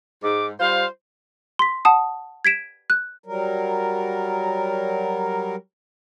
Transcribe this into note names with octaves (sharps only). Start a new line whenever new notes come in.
G#2 D6
G3 F4 C5 F5
C6 B6
F#5 A5 D#6
G#6 B6 D7 E7
F#6
F#3 G3 A#4